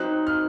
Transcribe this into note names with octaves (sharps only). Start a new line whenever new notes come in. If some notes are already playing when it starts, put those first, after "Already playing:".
Already playing: F#3 C4 D#4 F#6
F6